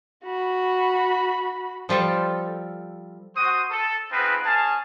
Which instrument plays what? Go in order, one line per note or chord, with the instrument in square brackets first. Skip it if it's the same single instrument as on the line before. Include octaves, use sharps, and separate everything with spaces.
[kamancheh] F#4 B5
[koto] F3 G3 F4 A4
[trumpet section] F#4 C5 D#6
A4
B3 C4 D#4 F4 G#4 B4
C#4 G#4 F5 A5